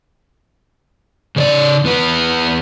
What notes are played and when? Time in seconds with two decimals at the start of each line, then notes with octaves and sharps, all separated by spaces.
1.36 C#3 C#5 D5
1.84 E2 B3 B4